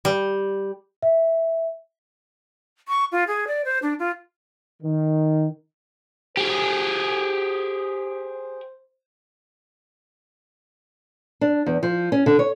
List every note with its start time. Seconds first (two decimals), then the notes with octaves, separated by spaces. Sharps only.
0.05 G3
1.02 E5
2.88 C#6
3.12 F4
3.27 G#4
3.47 D5
3.65 C5
3.82 D4
3.99 F4
4.83 D#3
6.37 G4 G#4 C5
11.41 D4
11.66 E2
11.83 F3
12.12 C#4
12.26 D3
12.39 C#5